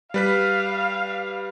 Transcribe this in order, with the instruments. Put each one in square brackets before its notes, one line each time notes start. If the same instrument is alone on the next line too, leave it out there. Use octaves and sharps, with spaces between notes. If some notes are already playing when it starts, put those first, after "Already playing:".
[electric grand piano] G3 B4 B6 [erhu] F5